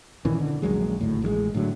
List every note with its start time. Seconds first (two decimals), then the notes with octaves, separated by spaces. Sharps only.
0.25 A#2 D#3 E3 C#4
0.38 D3
0.62 A#1 D#2 F#3 G#3
1.01 G#1 D2 A2
1.22 A1 D3 G#3
1.54 A2 D3 F#3